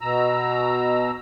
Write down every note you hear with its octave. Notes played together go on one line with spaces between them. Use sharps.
B2 A#5 E6